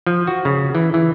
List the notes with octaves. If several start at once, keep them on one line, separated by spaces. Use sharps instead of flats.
F3
F#4
C#3
E3
E3